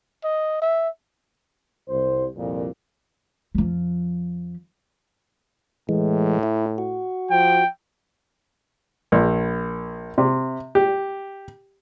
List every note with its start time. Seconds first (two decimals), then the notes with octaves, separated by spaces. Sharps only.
0.24 D#5
0.62 E5
1.89 C2 C5
2.37 C2 F2 A#2
3.55 F2 F3
5.89 A2 E3 G#3
6.43 E4
6.78 F#4
7.31 F3 G5
9.12 A#1
10.18 C3
10.75 G4